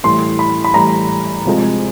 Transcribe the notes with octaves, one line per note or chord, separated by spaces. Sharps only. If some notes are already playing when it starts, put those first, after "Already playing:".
A2 E3 G3 C6
B5
B5
A2 E3 G3 A#5
C3 F3 G#3